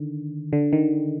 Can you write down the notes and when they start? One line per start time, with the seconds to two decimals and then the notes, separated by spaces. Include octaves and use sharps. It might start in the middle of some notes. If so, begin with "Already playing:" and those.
Already playing: D3 D#3
0.53 D3
0.73 D#3